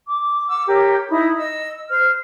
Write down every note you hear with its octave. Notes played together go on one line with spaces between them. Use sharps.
D6
F#5 D6 E6
G4 A#4 C#5
D#4 E4 B5 D#6
D#5 E6
C5 F6